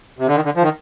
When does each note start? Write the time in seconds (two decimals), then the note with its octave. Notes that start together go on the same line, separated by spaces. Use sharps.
0.18 C3
0.28 D3
0.36 D#3
0.45 D3
0.56 F3
0.62 D#3